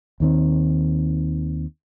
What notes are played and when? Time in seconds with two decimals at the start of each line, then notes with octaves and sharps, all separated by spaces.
0.20 D#2 D#3 C4